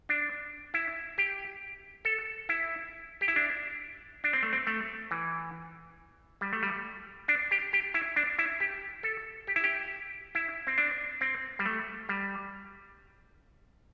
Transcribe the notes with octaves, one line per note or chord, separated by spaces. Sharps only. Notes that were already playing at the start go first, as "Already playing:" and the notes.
D4
E4
G4
A4
E4
G4
E4
D4
D4
C4
A3
C4
A3
E3
G3
A3
G3
D4
G4
G4
E4
D4
E4
G4
A4
G4
E4
G4
E4
C4
D4
C4
G3
A3
G3